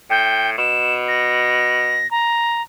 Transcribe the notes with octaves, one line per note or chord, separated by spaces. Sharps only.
A2 G5
B2 E7
A#6
A#5